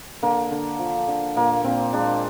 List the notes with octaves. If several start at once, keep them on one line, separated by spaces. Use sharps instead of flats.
D3 A#3
D3
F3
D3
A#2 A#3
A#2 C4
G#3 D4